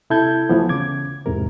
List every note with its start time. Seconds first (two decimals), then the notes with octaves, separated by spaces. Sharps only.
0.10 C3 E4 A4 A5 G6 G#6
0.49 E3 F3 A3 B3
0.69 C#3 D6 G#6
1.26 E2 G#2 C3 A#4